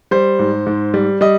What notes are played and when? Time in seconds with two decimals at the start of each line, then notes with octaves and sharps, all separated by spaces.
0.11 G3 C5
0.39 G#2
0.67 G#2
0.94 G3
1.21 G3 D#5